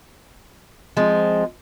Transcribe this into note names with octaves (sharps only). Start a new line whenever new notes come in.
F3 G#3 C4